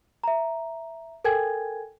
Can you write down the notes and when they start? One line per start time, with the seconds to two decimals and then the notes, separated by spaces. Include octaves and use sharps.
0.24 E5 A#5
1.24 A4 A#4 G5 G#5 G#6